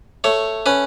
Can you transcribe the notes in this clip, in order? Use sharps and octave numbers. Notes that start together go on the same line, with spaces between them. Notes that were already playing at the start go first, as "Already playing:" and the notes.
A3 C#5
C#4 B4